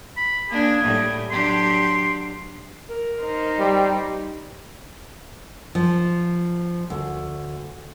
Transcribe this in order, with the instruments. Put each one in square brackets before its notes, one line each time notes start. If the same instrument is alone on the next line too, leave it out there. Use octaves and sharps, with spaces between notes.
[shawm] B5
[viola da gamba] A#3 D4 [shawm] G#4
[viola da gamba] A2 G3
[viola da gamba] F#3 D4 G4 [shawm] C6
[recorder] A#4
[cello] D#4 C5
[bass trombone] G3 [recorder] G5
[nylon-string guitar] F3
D2